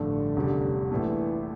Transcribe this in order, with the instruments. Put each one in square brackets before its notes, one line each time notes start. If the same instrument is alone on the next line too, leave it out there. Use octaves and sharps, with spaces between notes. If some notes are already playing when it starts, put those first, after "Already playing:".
Already playing: [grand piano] A1 G2 F3 A3 [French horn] D3
[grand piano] F1 E2 C#3 G3
[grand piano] A#1 A#2 A3 [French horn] E3